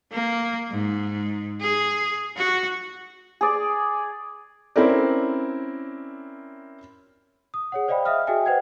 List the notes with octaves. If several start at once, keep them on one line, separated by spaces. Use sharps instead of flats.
A#3
G#2
G#4
F#4
G#4 D5
C4 C#4 E4 A#4 D5
D#6
G#4 C#5 F#5
C5 D5 D#5 F5 G5 B5
E5 F5 D#6 F6
F#4 G#4 D#5 E5 G5 G#5
B4 C5 F#5 G5 G#6